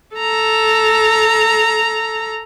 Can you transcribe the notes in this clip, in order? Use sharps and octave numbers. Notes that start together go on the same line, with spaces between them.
A4 A#5